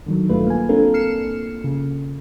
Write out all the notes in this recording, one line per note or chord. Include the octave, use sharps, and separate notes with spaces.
D3 D#3 F#3
A#1 G2 A3 F4 B4
A#3 G#5
A#3 C4 D4 F4 A4 A#4
F6 C7 C#7 E7
C#3